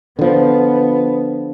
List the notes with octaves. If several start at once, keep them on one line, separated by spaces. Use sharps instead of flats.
D3 F3 B3